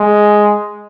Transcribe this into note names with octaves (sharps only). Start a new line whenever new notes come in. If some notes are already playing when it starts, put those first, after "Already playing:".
Already playing: G#3